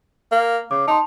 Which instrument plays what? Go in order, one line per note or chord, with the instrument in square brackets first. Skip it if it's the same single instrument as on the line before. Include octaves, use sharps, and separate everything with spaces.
[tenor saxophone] A#3
[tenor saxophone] C#3 [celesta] D6
[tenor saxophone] D#4 [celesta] A5 C6